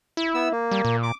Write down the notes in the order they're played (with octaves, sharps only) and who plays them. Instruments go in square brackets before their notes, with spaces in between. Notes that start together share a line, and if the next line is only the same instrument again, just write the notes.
[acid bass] E4
[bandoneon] B3 E6
A#3
[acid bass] G3
A#2
[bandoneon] D6